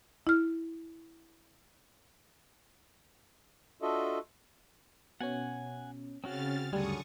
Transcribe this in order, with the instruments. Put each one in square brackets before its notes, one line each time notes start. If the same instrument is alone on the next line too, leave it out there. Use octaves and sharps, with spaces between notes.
[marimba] E4 F6
[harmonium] D4 F4 F#4 A4 D#5 E5
[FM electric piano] B2 C#4 [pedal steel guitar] F#5 G#5
[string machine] C#3 F6 A6 [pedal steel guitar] C4 C#4 F#4
[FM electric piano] D2 G2 G3 [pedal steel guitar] D3 F#3 G#4 [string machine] C#6 D#6